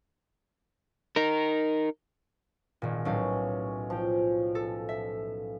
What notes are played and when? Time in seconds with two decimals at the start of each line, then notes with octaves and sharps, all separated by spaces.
1.16 D#4 A#4
2.82 G#1 A#2
3.05 B1 A2 C#4 F5
3.90 F3 G5
4.55 A4
4.89 E5